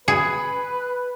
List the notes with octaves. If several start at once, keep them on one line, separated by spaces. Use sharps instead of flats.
G#4 B4